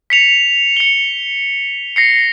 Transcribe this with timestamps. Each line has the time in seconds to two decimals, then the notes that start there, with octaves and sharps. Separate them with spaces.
0.10 B6 C#7 F7
0.77 C#7 G7
1.96 A#6 C7 C#7